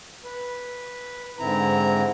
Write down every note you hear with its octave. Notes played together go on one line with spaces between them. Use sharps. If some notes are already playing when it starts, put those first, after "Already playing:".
B4
G#2 D3 C4 E4 A#5